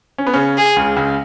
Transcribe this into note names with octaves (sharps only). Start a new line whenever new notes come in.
C#4
B3
C#3 C#4
G#4
C#2 C#3
C#2 C#3